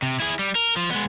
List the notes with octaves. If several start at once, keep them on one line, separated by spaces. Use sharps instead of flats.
C3
E4 G#4
G3
A#4
F3
G#3 B3